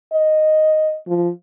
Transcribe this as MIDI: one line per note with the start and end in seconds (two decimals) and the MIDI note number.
0.12 0.97 75
1.08 1.30 53